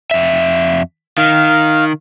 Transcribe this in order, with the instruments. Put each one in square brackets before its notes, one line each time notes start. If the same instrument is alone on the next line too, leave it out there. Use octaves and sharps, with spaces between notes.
[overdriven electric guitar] F2 E5
[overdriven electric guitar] D#3 [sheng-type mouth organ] F5